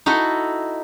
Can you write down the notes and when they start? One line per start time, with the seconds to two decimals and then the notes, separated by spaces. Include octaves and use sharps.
0.06 D#4 E4 F#4 A4